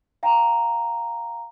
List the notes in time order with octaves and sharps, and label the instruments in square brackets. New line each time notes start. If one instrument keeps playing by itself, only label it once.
[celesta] F5 G5 A#5